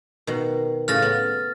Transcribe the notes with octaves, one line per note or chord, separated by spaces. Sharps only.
B2 D#3
A2 C#3 F6 A6 A#6
B3